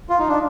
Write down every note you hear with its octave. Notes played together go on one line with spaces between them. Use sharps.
F4
D#4
D4